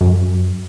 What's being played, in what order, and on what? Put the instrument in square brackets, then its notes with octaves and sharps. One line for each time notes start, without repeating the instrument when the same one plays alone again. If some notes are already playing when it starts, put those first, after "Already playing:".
[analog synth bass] F#2